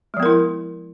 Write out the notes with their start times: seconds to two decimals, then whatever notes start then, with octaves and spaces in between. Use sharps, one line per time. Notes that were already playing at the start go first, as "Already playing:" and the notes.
0.14 G#3
0.17 F3
0.20 B3
0.23 A#4
0.26 E4